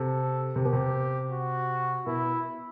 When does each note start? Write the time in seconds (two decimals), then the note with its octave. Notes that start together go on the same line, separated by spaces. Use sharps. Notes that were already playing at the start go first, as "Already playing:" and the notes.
Already playing: C3 A4
0.56 C3 G4
0.65 B2
0.73 C3
1.31 F#4
2.06 B2 E4